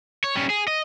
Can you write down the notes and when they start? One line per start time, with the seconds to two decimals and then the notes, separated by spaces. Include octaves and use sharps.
0.24 C#5
0.36 G3 C#4
0.50 G#4
0.68 D#5